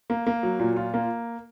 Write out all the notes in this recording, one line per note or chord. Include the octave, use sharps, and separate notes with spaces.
A#3
A#3
F#3
A#2
F4
A#3